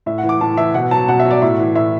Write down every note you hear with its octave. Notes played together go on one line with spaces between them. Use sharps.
A2 E5
F#5
E3
D6
A2 A5
E3 E5
B2 F#5
F#3 A5
B2 F#5
E5
F#3
D5
A2 E5
E3
A2 E5